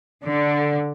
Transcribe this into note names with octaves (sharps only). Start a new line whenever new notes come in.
D3